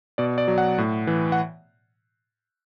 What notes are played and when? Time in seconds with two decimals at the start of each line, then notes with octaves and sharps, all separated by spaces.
0.18 B2 D5
0.38 D5
0.48 F#3
0.58 F#5
0.78 A2
1.07 E3
1.32 F#5